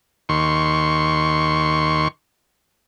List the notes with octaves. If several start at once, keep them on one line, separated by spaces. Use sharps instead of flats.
D#2 C6 C#6